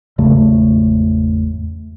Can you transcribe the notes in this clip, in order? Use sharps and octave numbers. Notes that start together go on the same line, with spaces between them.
G#1 E2 C#3 A3